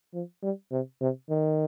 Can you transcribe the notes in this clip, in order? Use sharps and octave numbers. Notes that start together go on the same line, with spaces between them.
F3
G3
C3
C3
D#3